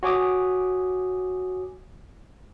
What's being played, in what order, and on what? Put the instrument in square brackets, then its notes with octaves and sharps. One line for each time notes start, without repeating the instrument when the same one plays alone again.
[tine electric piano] F#4 C#5 G#5 D6 D#6